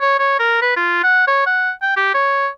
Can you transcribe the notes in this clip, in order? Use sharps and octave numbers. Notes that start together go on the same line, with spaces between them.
C#5
C#5
A#4
B4
F4
F#5
C#5
F#5
G5
G4
C#5